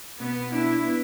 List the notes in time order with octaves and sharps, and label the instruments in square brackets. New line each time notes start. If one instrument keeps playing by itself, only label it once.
[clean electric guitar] B2 [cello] B3
[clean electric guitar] D4 [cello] E4
[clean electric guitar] B3